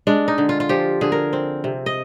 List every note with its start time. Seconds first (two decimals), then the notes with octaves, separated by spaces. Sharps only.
0.07 G#3 D4
0.28 D#4
0.38 D3
0.49 F4
0.60 F4
0.69 F3 G4
1.01 D3 G#4
1.12 A#4
1.33 C4
1.64 C3
1.86 D#5